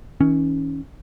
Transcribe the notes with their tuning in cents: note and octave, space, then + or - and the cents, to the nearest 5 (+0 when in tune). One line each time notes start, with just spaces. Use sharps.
D#3 +45 C#4 +0